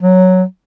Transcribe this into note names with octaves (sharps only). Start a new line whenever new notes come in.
F#3